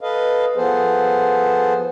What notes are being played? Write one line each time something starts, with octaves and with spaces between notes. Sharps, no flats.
A4 B4 D#5 F5
F3 B3 G#4 A4 C5